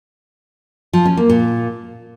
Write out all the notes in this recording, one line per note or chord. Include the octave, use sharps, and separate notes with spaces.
F3
C#4
A#3
A#2